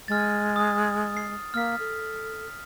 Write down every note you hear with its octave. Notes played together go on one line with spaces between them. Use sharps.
G#3 F6 A6
D#6
C7
A#3 F6 B6
A4